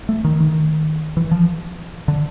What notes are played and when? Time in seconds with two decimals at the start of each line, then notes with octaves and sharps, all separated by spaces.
0.09 A3
0.25 D#3
0.40 D#3
1.17 E3
1.31 F3
2.08 D3